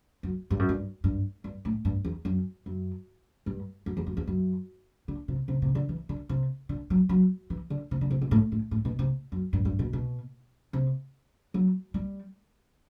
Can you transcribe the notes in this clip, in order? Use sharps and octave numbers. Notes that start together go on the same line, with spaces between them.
F#2
G2
F#2
G2
G2
G2
A2
G2
E2
F#2
F#2
G2
F#2
E2
F#2
E2
F#2
D3
C3
C3
C3
D3
E3
D3
C3
D3
F#3
F#3
E3
D3
C3
D3
C3
B2
A2
A2
A2
B2
C3
F#2
G2
G2
B2
B2
C3
F#3
G3